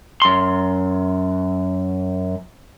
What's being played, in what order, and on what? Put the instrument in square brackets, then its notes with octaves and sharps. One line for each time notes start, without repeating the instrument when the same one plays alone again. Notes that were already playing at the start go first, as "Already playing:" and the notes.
[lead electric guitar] F#2 C6